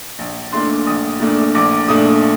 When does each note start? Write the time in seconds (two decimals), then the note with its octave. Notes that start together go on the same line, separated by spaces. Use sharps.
0.19 A#1
0.52 A#2 A3 D4 C6
0.86 A#1 D#6
1.20 A#2 A3 D4
1.55 A#1 D6
1.88 A#2 A3 D4 D#6